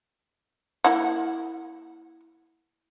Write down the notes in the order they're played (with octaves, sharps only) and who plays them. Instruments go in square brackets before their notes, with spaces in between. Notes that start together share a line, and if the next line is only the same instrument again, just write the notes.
[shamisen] A#3 E4 F#5